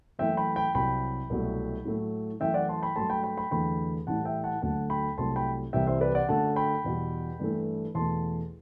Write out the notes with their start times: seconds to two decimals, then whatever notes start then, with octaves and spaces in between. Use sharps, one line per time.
0.19 F#2 E3 A3 E5 G5
0.37 G5 B5
0.56 G5 B5
0.75 C2 C3 F#3 G5 B5
1.30 C2 B2 F#3 A3
1.85 A2 F#3 A3
2.40 F#2 E3 A3 E5 G5
2.54 D5 F#5
2.69 A5 C6
2.82 G5 B5
2.96 G2 F#3 A3 A5 C6
3.10 G5 B5
3.24 G5 B5
3.38 G5 B5
3.51 E2 D3 F#3 A3 G5 B5
4.07 A2 E3 G3 F#5 A5
4.25 E5 G5
4.44 F#5 A5
4.62 D2 D3 F#3 A3 F#5 A5
4.90 G5 B5
5.18 C2 C3 F#3 A3 A5 C6
5.36 G5 B5
5.73 C2 C3 E3 G3 E5 G5
5.87 C5 E5
6.01 B4 D5
6.15 D5 F#5
6.28 F#2 D3 F#3 A3 F#5 A5
6.56 G5 B5
6.84 E2 B2 G3
7.40 G2 E3 A3
7.95 E2 B2 A3 A5 C6